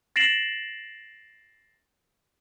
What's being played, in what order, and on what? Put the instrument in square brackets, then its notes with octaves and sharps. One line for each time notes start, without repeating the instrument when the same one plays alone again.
[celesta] A6 A#6 C7 D7 E7 F#7